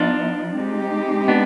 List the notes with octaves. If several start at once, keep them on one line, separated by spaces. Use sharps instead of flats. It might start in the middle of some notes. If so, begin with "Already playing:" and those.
Already playing: F3 B3 D4 D#4 F4
G#3 C4 D#4 G4
B3 D4